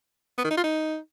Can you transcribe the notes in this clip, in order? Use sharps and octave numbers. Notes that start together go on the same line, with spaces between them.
B3
D#3
D#4
F4
D#4